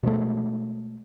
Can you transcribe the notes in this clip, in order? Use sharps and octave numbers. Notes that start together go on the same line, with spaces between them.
B2 F3 G#3 A3